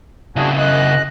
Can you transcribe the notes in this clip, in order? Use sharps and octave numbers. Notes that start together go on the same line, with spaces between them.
C#3 D4 E4 F#4 G#4
F#2 D#5 F#6